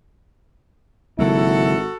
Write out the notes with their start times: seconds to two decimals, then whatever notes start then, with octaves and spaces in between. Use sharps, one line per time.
1.19 G#1 C#3 F#3 A#3 E4 F#4 A4